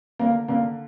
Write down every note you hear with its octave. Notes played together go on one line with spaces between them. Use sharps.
D3 A#3
D3 A#3